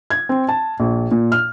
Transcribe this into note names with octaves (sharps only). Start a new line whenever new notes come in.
G#6
C4
A5
A#1
A#2
F6